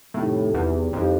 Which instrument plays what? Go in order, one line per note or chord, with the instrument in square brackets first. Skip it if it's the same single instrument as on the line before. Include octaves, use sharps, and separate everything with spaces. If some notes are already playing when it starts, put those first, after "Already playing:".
[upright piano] F2 C3 D#3 G3 [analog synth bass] A2
[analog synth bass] E2
[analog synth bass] F2 [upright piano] E3 G3 C4 D#4